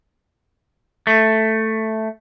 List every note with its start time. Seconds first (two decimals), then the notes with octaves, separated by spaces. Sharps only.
1.07 A3